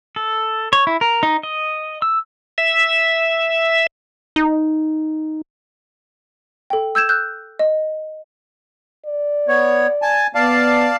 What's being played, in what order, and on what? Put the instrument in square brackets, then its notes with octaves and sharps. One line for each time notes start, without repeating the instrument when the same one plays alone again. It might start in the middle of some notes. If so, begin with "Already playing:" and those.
[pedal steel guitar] A4
C#5
E4
A#4
D#4
D#5
E6
[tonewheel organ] E5
[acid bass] D#4
[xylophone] A4 G5
E6 G6 G#6 E7
E6 F#6 G6
D#5
[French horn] D5
[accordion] B3 C#5
G#5 A5
[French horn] B3 [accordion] D5 F5 A5